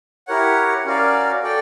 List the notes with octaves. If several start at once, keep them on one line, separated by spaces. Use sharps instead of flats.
E4 G4 A#4 C#5 F#5
C#4 F#4 A#4 D5 F5
F#4 A4 D5 G5